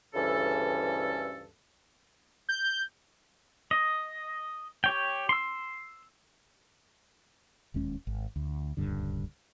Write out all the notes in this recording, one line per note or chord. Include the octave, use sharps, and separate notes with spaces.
D2 G2 C#3 E3 C#4 A4
G6
D#5
G4 C#5 G5
C6 E6
E1 D#2 G#3 C#4
G#1
D2
D#1 C#2 G2 D3